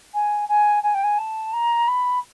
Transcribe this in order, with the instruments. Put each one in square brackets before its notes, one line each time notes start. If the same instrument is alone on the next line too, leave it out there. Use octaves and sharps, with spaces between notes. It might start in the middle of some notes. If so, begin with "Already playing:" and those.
[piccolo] G#5
G#5
G#5
G5
G#5
A5
A#5
B5